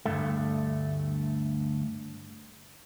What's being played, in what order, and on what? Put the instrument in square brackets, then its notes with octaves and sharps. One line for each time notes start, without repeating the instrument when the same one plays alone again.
[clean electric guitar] D2 G2 A3